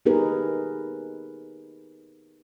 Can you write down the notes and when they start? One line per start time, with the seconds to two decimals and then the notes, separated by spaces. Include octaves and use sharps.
0.06 B3 D#4 G4 G#4 A#4 B4